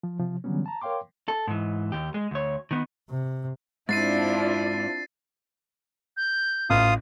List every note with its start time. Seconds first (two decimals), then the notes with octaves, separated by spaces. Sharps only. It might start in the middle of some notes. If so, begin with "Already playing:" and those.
0.03 F3
0.19 C3 F3
0.44 D3 E3 F#3 G3 B3 C#4
0.66 A5 A#5
0.82 A#4 C#5 F5 G5 C6 D6
1.28 A4
1.47 G#2 E3
1.92 D#2 G4
2.14 G#3
2.31 D2 C#5
2.71 D#3 B3
3.10 C3
3.89 G#2 C4 D4 E4 F4 A6 C7 D#7
6.17 G6
6.70 A1 F4 F5 D#6